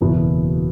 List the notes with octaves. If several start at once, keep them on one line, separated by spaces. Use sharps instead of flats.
F#1 E2 B2 B3 E4